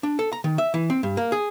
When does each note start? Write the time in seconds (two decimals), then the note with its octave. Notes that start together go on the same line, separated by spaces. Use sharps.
0.03 D4
0.19 A4
0.33 A#5
0.44 D#3
0.58 E5
0.74 E3
0.90 C4
1.03 G2
1.17 A#3
1.32 G#4